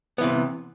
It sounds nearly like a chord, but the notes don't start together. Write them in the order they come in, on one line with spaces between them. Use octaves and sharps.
B3 E3 C3